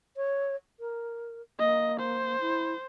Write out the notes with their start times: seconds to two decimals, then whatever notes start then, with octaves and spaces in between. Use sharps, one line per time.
0.17 C#5
0.80 A#4
1.59 A#3 D#5
2.00 C5
2.41 E4